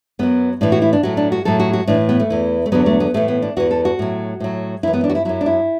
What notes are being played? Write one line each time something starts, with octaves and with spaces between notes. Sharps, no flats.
F#2 F#3 B3
A2 E3 D4
F#4
E4
D4
A2 F#3 F#4
D4
F#4
A2 F#3 A4
F#4
F#4
A2 E3 D4
B3
A3
E2 E3
A3
E2 D3 F#3 B3
A3
B3
A2 E3 A3
B3
D4
E2 E3 F#4
A4
F#4
A2 F#3
A2 F#3
F#2 E3 E4
B3
D4
F#4
E4
F#2 F#3 E4
D4
E4